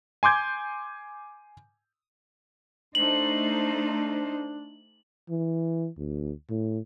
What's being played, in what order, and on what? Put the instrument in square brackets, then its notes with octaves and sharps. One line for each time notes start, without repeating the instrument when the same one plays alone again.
[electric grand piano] G#5 C6 D6 G6 G#6
[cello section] A3 D#4 C5 [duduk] D4 [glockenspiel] F#7
[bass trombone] E3
D2
A2